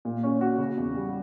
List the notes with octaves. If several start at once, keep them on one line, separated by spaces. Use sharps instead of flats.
A#2
C#4
F#4
C#3
E2
G3